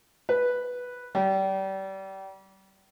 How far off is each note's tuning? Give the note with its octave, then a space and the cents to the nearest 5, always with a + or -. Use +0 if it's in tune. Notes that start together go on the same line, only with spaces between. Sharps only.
B4 +0
G3 -30